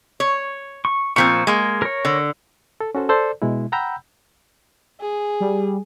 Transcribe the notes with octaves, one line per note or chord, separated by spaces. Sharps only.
C#5
C#6
A#2 F3 C4 C#6
G#3 A#3
A#4 C#5
D3
A4
C#4 F#4 A4 C5
A4 C5 D5
B2 G#3 E4
F#5 G5 A#5 B5 E6 G6
G#4
G3